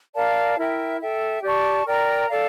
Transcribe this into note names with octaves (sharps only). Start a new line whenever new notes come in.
A#4 D5 F5 A5
E4 A#4 E5 G5
A4 E5 G5
G4 D5 A5 C#6
A#4 D5 G5 A#5
A4 D5 F5